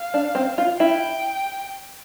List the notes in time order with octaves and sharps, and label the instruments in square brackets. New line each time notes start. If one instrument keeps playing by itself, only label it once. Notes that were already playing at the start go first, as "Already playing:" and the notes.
Already playing: [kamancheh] F5
[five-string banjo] D4
C4
F4
[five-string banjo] E4 [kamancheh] G5